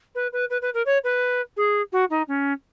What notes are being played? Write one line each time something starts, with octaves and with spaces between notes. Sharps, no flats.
B4
B4
B4
B4
A#4
C#5
B4
G#4
F#4
D#4
C#4